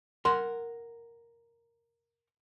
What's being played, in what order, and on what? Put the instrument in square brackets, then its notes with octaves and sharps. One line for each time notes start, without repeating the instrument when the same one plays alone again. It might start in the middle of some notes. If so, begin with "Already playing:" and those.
[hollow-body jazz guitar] A#4 F#5 [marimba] C6